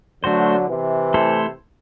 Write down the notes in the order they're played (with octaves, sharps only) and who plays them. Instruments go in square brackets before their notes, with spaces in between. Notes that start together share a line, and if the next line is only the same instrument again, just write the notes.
[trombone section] D3 F#3 [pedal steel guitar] A3 D4 F#4 C5
[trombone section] C3 E3
[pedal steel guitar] A3 E4 A4 C5